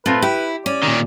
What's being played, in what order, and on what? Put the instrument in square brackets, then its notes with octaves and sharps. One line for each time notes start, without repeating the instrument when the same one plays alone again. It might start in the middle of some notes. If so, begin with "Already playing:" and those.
[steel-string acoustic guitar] A#2 [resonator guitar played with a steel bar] A3 C4 F4 [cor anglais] B4
[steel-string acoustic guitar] E4 [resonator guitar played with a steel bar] G4
[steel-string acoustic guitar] C#4 [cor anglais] D5
[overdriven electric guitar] A#2 D#3